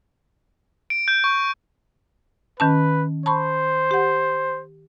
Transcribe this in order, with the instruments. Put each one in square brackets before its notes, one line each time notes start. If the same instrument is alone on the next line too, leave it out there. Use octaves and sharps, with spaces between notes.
[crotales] D7
G6
C#6
[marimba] D#3 C#4 A5 [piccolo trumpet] B4
[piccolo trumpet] C5 [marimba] A5 B5 C#6
[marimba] G4 F#5